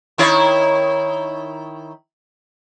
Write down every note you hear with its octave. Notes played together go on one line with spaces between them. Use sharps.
D#3 E4 C#5